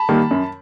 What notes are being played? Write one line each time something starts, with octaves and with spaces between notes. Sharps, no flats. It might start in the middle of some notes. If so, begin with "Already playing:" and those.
Already playing: A5 B5
D#3 G3 A#3
F#2